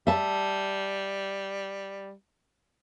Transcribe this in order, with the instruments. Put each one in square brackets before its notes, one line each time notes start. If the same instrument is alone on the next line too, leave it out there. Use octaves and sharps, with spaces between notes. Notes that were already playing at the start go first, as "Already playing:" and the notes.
[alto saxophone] G3 [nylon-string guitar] E5 A5